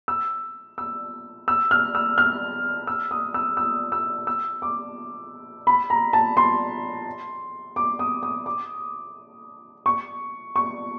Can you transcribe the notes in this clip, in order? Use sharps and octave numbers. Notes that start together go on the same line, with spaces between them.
E6
E6
E6
F6
E6
F6
E6
D#6
E6
E6
E6
E6
D6
B5
A#5
A5
C6
D6
D#6
D#6
D6
C#6
C#6